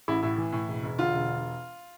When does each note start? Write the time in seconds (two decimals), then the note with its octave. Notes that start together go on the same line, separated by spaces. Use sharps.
0.08 A1 E4
0.23 A2 E4
0.38 E3
0.52 A2
0.68 E1
0.83 E1
0.98 D3 F4
1.15 E1